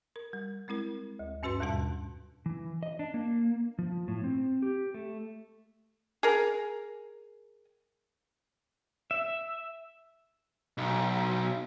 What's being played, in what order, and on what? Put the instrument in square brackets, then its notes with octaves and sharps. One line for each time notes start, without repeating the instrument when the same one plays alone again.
[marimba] A#4
G3
G#3 C4 E4 A#4
D2
G2 C#4 F#4 B4 C6
D#2 G#2 B2 G3 D4 A5
[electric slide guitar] E3
D#5
D4
A#3
F3
A2
C4
G4
A3
[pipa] G#4 A#4
[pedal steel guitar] E5
[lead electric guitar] B1